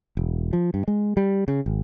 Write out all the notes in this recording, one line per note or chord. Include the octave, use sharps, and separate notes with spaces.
E1
F3
G2
G#3
G3
C#3
G#1